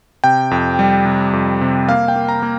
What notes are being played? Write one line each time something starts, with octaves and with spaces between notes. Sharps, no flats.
C3 G5
F2
G3
C3
F2
C3
A#3 F5
G5
A#3
A#5
A#3